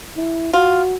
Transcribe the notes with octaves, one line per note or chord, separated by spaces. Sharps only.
E4
F4 F#4